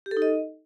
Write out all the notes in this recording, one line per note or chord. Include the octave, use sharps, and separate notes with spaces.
G4
A4
D#4
D#5